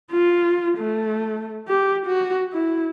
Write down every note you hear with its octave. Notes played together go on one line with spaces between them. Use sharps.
F4
A3
G4
F#4
E4